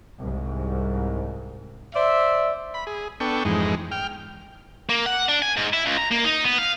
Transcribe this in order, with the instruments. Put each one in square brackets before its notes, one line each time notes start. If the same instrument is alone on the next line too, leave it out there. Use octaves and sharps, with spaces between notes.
[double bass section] C2 G#2
[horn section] C5 D5 E5
[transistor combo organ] B5
G#4
B3 D4 A4 G5 C#6
F2 G#2 E3 G#3 D#4
G5 F6
[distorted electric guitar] A#3
F#5
D4
G#5
G#2
E4
C#2
A#5
A#3
D#4
B3
F5